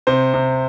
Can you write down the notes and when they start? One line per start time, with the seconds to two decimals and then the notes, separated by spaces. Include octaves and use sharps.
0.07 C3 C5
0.34 C3